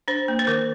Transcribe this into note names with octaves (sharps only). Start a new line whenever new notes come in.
D4 C5
A#3
C5
D#3 A#4